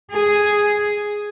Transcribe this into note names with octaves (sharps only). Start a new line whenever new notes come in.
G#4